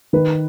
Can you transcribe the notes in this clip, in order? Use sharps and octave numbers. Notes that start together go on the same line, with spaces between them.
D#3 B4